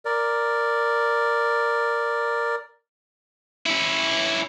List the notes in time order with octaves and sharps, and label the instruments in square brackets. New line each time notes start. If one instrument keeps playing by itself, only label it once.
[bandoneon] A#4 D5
[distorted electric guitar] C#4 E4